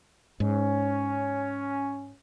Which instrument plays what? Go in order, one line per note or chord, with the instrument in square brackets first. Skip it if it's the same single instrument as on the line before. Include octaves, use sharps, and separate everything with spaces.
[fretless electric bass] G#2 [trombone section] C#4